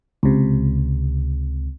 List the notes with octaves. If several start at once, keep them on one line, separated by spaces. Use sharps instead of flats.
C#2 C3